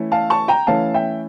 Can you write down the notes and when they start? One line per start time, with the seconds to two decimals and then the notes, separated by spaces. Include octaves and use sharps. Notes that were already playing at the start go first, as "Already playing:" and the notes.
Already playing: E3 A3 C#4 E4
0.12 F5 A5
0.30 A5 C#6
0.48 G5 A#5
0.67 E3 A3 C#4 F5 A5
0.94 E5 G5